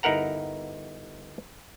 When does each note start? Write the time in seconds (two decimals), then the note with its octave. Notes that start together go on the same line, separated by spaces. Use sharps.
0.03 G1 D#4 E4 A#4 F#5 A#5